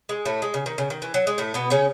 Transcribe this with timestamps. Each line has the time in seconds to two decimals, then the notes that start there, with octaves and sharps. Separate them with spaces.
0.09 G#3
0.25 A2 A3
0.42 G#3
0.54 C#3
0.66 D#3
0.78 C#3
0.90 D#3
1.02 E3
1.14 F#3
1.27 G#3
1.38 A2 A3
1.54 B2 B3
1.70 C#3 C#4